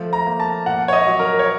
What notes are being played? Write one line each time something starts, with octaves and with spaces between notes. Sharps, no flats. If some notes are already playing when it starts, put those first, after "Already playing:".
Already playing: F3 A3
A#5
A#3
A5
A#2 F#5
C#5
D#5
F#3
A#4
C#5